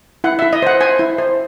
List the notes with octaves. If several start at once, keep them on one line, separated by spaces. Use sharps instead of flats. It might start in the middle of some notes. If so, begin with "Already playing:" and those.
E4 F#5
E4 E5
D#5
C5 F#5
C5 G#5
E4
C5